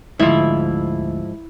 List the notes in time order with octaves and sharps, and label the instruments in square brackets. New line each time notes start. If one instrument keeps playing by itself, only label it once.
[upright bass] D2 [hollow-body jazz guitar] G#2 F3 [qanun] E4